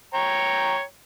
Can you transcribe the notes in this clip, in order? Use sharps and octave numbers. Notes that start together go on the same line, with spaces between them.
C#5 G5 A#5